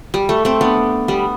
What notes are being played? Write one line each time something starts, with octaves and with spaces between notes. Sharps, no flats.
G3
A3
A3 C4
B3 D4
G3 B3